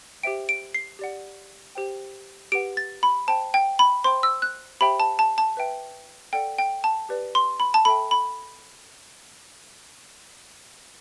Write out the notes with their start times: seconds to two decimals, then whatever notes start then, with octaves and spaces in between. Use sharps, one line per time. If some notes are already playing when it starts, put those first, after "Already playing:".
0.23 G4 C5 E5 G5 D7
0.49 D7
0.74 C7
0.99 G4 D5 F#5
1.75 G4 C5 G5
2.52 G4 B4 F#5 D7
2.77 A6
3.03 B5
3.28 C5 G5 A5
3.54 G5
3.79 B5
4.04 C5 G5 C6
4.23 E6
4.42 F#6
4.81 G4 C5 E5 G5 B5
5.00 A5
5.19 A5
5.38 A5
5.57 B4 E5 G5
6.33 A4 D5 F#5 G5
6.58 G5
6.84 A5
7.09 G4 B4 D5
7.35 C6
7.60 B5
7.74 A5
7.85 A4 E5 G5 B5
8.11 B5